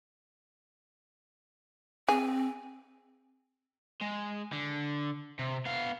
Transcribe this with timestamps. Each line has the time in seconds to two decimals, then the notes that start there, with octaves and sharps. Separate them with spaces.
2.08 C4 G#4
4.01 G#3
4.52 D3
5.39 C3
5.66 B3 F5